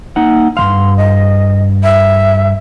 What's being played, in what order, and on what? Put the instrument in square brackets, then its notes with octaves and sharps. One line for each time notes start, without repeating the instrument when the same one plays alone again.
[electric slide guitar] A#3 D#4 F#5
[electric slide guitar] G2 E3 F5 [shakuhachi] C6
[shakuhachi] D#5
E5